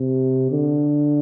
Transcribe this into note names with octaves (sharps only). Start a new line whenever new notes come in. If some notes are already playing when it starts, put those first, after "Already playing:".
Already playing: C3
D3